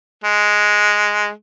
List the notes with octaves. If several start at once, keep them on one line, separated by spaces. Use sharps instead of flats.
G#3